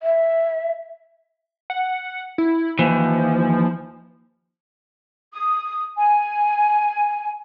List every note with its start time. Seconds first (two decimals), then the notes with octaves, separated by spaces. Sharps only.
0.02 E5
1.70 F#5
2.38 E4
2.79 D#2 E3 F3
5.33 D#6
5.97 G#5